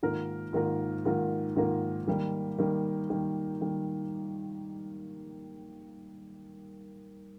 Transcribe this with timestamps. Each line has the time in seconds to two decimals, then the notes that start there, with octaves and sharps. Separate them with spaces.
0.03 G#2 D#3 A#3 F4 A#4
0.53 G#2 D#3 A#3 F4 A#4
1.05 G#2 D#3 A#3 F4 A#4
1.56 G#2 D#3 A#3 F4 A#4
2.07 D#3 G3 A#3
2.59 D#3 G3 A#3
3.10 D#3 G3 A#3
3.61 D#3 G3 A#3